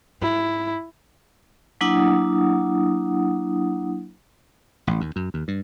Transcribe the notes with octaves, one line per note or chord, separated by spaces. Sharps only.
G#2 E4
F#3 A#3 D4 E4 F#5 D#6
A1
D#2
F#2
D#2
G2